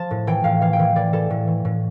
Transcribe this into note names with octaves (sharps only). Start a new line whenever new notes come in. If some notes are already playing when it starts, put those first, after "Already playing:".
Already playing: F3 A5
A2
E3 G5
A2 F5
E3 F5
G5
E3
E3 D5
E3 A4
A2
E3
A2